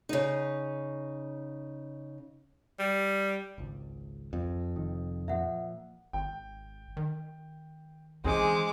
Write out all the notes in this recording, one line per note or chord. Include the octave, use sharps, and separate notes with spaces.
C#3 D#4
G3
G#1 C#2
F2
F1 D#3
A#2 F3 E5 F#5
G#1 G5
D#3
E3 G#3 C4 C#4 D#4 G#4 D6